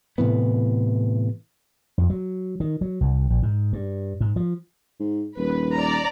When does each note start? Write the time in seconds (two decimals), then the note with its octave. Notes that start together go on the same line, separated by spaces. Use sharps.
0.18 A2 C3 E3 B3
1.98 F2
2.10 F#3
2.60 D#3
2.81 F#3
3.01 C2
3.30 A#1
3.43 G#2
3.73 G2
4.21 G#2
4.36 F3
5.00 G#2
5.37 D#1 B4
5.75 D5 A#5